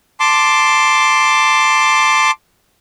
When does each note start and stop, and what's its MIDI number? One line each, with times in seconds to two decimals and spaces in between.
0.20 2.31 81
0.20 2.31 84
0.20 2.31 86